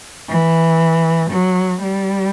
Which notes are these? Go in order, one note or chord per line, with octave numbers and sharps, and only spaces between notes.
E3
F#3
G3